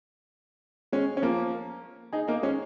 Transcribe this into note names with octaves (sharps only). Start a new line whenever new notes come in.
G#3 C#4
C#4
F3 A#3
D#4 G#4
A#3 D#4
G#3 C#4